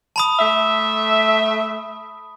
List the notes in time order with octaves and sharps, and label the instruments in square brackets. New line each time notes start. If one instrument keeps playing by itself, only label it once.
[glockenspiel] A5 B5 D#6
[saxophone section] A3 E5